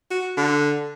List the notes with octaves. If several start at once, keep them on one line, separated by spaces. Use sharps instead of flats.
F#4
D3